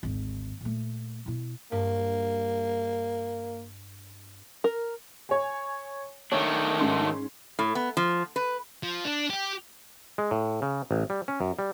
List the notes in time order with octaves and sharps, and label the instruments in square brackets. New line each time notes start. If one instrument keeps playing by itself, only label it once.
[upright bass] G#1 D2
A#2 A3
B2 E4
[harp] G2 [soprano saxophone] A#3
[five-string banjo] A#4
[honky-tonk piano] C#5 G#5
[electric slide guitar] D#3 A3 D4 [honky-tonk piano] C#5
[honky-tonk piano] G#2 C#4 C6
[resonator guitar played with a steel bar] A2
B3
F3
B4
[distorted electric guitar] F3
D4
G4
[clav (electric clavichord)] G#3
A2
C#3
A1
G3
C#4
F#2
G3